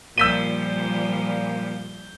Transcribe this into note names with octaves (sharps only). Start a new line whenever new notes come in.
A#2 F3 G3 E6 G6 B6 D#7 G7